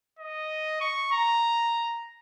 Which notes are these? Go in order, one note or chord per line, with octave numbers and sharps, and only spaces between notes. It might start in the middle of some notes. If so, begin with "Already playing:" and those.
D#5
C#6
A#5